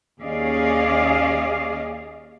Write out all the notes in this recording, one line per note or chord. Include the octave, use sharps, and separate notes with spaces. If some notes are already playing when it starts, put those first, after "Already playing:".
D#2 C#4 G#4 D5 D#5 F5